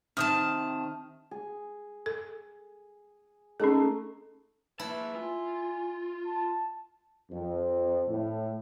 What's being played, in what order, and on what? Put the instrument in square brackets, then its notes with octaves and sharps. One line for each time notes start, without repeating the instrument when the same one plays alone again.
[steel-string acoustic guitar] C3 D#3 A5 [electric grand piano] D#6 F6
[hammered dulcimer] G#4
[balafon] A4
[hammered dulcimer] A3 D#4 A#4 [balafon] C#4 G#4
[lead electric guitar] A#3 A5 [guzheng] E4 [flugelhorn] B4
[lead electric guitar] F4 [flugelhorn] G#5
[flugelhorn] A5
[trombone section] F2
A2